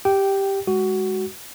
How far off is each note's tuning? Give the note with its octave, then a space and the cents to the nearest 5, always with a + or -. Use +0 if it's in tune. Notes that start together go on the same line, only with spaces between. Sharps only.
G4 +0 G5 -10
G#3 -5 F#4 +15